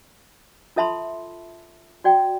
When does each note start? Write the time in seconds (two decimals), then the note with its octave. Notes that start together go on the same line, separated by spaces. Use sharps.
0.76 F4 A4 E5 A5 B5 C6
2.04 F#4 D5 G5